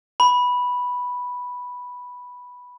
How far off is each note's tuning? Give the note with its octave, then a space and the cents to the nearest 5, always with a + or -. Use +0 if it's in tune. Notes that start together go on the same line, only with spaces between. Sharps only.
B5 -5